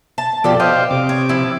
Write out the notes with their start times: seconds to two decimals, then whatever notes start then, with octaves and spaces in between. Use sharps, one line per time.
0.18 A5
0.44 B2 F3 G4 A4 D5
0.60 C5 D#5 F5 G5
0.91 C3 D6
1.09 C#5
1.29 F3 E4